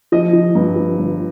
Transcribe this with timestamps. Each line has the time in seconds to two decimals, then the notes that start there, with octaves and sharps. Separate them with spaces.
0.12 F3 D#5
0.33 F3
0.55 G2
0.76 F3
0.98 G1